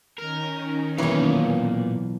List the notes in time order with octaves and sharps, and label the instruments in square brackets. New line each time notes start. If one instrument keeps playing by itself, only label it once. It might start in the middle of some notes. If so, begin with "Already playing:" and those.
[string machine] D#3 C#4 D#4 [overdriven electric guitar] A#4
[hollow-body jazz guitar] B1 E3 [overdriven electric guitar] A#2 C#5 [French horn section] A#3